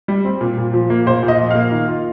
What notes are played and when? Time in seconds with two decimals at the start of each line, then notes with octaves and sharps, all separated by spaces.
0.08 G3
0.25 C4
0.41 A#2
0.58 A#2
0.73 F3
0.90 A#3
1.06 A#2 C5
1.23 A#2
1.28 D#5
1.38 F3
1.50 A#3 F5
1.72 D#3
1.88 F4